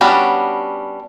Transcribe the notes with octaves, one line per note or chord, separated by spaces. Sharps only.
G3 B3 C#4 D4 F#4